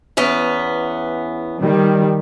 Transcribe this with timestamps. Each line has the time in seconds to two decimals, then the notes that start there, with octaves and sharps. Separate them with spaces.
0.17 E2 B3 C#4
1.60 D#3 G3